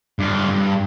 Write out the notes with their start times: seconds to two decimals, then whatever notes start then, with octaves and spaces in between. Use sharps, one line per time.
0.19 G2 F4
0.49 G2